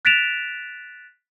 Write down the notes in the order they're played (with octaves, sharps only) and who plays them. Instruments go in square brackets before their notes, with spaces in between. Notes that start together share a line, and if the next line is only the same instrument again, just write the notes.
[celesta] F#6 A6 B6 D7 E7 F7